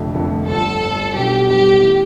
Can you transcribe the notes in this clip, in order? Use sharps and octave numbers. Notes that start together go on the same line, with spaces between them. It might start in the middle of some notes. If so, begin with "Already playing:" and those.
Already playing: F1 F2 D3 A3
F1 F2 D3 A3
G1 G2 F3 A4
G1 G2 F3
B1 B2 G3 D4 G4
B1 B2 G3 D4 G4
E3 A3